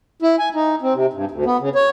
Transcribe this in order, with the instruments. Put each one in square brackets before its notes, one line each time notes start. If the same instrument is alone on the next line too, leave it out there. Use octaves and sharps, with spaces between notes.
[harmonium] E4
G#5
D#4
C4
C3
G2
D2
B3
C#3
C#5